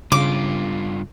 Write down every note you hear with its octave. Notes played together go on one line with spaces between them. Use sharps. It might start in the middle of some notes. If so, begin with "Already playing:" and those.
G2 C#3 F4 D6